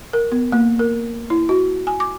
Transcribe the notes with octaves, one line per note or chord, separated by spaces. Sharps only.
A#4
B3
A#3
A#4
E4
F#4
G#5
D6